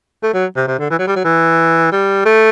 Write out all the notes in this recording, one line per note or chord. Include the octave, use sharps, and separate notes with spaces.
A3
F#3
C3
C3
D3
E3
F#3
G3
F#3
E3
G3
A3